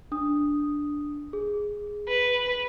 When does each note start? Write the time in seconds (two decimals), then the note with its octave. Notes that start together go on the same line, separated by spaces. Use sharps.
0.12 D4 D#6
1.33 G#4
2.08 B4